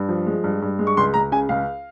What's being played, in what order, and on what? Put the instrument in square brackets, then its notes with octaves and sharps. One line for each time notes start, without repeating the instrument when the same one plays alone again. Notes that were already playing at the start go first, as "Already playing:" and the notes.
Already playing: [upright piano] G2
F3
G#3
G2
G2
G#3
C#6
C#2 C6
C#2 A#5
C#3 G#5
C#2 F5